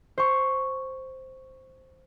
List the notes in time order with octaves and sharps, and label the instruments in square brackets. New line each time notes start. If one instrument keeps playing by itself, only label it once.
[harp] C5 C#6